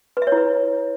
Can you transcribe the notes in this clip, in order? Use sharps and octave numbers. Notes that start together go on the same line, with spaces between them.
B4
E5
C#5
E4
B4